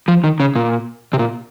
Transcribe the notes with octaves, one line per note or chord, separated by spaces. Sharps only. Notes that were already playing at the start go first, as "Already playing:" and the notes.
F3
D#3
C#3
A#2
C3
A#2